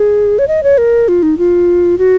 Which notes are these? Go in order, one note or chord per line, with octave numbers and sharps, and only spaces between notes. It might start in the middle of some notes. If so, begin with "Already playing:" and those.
Already playing: G#4
C#5
D#5
C#5
A#4
F4
D#4
F4
F#4